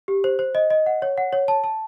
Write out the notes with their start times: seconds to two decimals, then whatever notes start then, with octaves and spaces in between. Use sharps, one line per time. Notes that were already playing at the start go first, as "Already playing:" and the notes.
0.08 G4
0.24 C5
0.39 C5
0.55 D#5
0.70 D#5
0.86 F#5
1.02 C#5
1.18 F#5
1.33 C#5
1.48 A5
1.64 A5